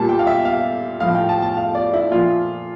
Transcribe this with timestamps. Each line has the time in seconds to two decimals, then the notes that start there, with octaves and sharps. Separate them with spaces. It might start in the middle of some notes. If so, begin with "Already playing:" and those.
Already playing: A#2 G3 A5
0.09 G5
0.19 F5
0.27 E5
0.45 F5
1.00 A2 F3 F5
1.15 G5
1.29 A5
1.42 A5
1.57 F5
1.75 D5
1.94 E4
2.12 A#2 F3 F4